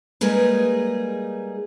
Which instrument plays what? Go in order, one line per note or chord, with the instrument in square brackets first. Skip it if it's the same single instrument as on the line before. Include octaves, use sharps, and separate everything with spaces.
[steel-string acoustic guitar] G3 G#3 A#3 D#4 G#4 B4